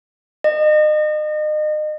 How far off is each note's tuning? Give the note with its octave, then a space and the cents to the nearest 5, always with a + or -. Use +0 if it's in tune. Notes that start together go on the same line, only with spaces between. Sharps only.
D#5 -35